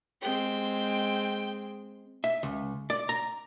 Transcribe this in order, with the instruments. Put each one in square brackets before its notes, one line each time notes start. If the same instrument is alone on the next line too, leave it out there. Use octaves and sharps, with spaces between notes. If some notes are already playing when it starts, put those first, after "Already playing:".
[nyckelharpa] G#3 C4 [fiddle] G5
[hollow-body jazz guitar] E5
C#2
D5
A#5